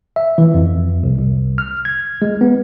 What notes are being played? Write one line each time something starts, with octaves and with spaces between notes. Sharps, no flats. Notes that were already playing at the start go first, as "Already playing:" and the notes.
E5
E3
F2
C2
C2
F6
G#6
G#3
B3